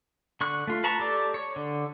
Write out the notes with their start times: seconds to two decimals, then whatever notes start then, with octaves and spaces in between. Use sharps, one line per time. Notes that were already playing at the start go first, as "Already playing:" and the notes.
0.41 D3 C#6 F#6
0.67 A3 F4
0.84 B4 A5 A#5 C#6
0.99 G4 A4 D5
1.34 C#5
1.56 D3